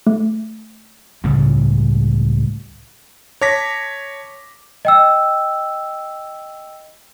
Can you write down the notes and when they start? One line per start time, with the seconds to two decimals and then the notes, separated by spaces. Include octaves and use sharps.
0.07 A3
1.24 C#2 A2 C#3 G3
3.41 C#5 A5 D6 A#6 B6
4.85 D#5 G5 E6